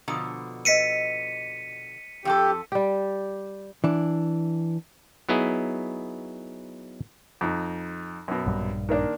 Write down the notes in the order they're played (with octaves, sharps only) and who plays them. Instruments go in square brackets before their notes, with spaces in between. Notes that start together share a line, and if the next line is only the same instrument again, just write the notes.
[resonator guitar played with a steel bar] B2 D3 F3 [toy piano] A#5 B5 D#6
[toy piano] B4 D#5 [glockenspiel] B6 C#7 D#7
[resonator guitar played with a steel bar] F2 F#4 A4 [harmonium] G4
[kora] G3 G4
[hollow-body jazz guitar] E3 D4
[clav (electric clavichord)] F#3 B3 D#4 E4 G#4
[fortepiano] F2 D#4
F#2 B2
[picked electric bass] A#1 G2 G3
[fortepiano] D#3 A#3 D4